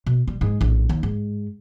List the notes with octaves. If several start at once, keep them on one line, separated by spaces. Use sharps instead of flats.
B2
G3
G#2 G#3
A#1 A2
D#2
G#2